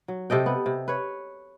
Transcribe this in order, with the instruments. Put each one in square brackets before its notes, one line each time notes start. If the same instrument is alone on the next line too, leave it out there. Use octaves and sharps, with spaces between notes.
[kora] F#3
C3 A4 D#5 G5
B3
C3
B4 C#5